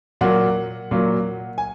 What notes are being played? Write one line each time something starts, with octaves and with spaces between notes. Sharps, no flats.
A#2 F#3 A#3 F#5
A#2 F#3 A#3
G#5